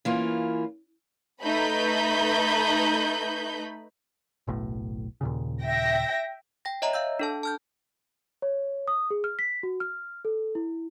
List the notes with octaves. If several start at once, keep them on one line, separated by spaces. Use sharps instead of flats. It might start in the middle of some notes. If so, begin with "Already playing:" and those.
E3 A#3 C#4 F4
A3 D#4 B4 B5 G6
F#1 B1 A2
D#2 A#2 C#3
E5 G5 A#6
G5 A#6
C#5 D#5 E5 A#5
F5 E6 G6
D4 A4 A5
A5 F6 G6
C#5
D#6
G#4
F6
B6
F#4
F6
A4
E4